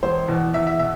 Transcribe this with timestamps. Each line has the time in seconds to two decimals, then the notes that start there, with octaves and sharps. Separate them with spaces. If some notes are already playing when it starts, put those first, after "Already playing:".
0.03 E1 C5
0.28 E2 B2
0.54 E2 E5
0.67 E5
0.79 B2 E5